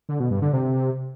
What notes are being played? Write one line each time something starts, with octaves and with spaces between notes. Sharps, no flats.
D3
B2
G2
D3
C3